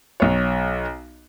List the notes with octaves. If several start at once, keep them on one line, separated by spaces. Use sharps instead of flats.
B1 C#5